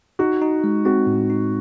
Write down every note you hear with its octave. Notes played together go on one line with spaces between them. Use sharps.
D#4 F#4
D#4
G#3
C4 F#4
A2
D#4